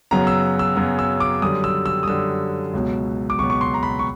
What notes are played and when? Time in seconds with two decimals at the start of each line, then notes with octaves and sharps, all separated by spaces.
0.11 F#2 C#3 F#3 B3 A#5
0.27 E6
0.59 E6
0.76 F#2 C#3 F#3 B3
0.99 E6
1.20 D6
1.42 F#2 D3 G3 D#6
1.64 E6
1.86 E6
2.03 D#6
2.07 F#2 D3 G3 E6
2.73 C#2 B2 F#3 B3
3.30 D6
3.38 C#2 B2 F#3 B3 C#6
3.50 C#6
3.61 C6
3.74 A#5
3.83 B5
3.99 C#6